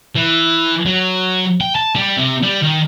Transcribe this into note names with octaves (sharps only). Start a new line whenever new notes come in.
E3
F#3
G5
A5
G3
C3
G3
D#3